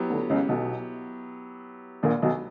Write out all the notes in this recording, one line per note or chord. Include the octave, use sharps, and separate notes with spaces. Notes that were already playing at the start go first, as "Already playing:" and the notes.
Already playing: F#3 B3 E4 G4
D2 D3
C#2 C#3
B1 B2
A#1 A#2
B1 B2